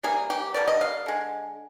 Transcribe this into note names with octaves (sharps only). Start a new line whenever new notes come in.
C3 G3 A#3 G#4
G4
D3 G3 A#3 D5
D#5
F5
D3 G#3